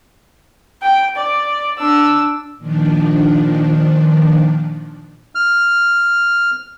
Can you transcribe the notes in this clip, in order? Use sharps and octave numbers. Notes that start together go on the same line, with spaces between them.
G5
D5
D4 E6
A#2 D#3 F3 D4
F6